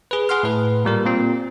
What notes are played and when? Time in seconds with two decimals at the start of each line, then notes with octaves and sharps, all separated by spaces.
0.11 G#4 B4
0.29 G#4 F#5 C6 F6
0.43 A2 B4
0.85 A#2 G3 A#4
1.05 A#2 C4